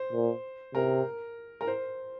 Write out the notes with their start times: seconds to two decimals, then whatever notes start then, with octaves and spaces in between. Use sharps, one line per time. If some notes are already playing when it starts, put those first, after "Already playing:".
Already playing: C5
0.13 A#2
0.74 C3 A#4
1.61 A#4
1.67 C5